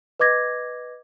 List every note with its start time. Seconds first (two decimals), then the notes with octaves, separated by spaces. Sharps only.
0.20 B4 D#5 D6 G#6 A#6